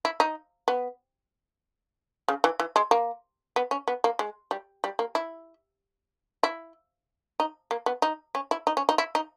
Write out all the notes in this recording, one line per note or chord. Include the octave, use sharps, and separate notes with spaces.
E4
D#4
B3
C#3
E3
E3
G#3
A#3
B3
C#4
B3
A#3
G#3
G3
G3
A#3
E4
E4
D#4
A#3
B3
D#4
C#4
E4
D#4
C#4
D#4
E4
D#4